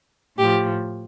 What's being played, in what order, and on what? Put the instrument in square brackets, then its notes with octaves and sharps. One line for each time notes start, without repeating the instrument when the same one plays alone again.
[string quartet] A2 F3 G4